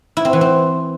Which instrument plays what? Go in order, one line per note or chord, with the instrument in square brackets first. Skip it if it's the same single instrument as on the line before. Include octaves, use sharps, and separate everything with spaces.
[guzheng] E4
C4
E3
C4